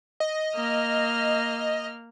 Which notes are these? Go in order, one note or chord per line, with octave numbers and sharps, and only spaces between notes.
D#5
A#3 F6